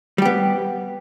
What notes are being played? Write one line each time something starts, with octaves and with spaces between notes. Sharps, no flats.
G3 B3 G4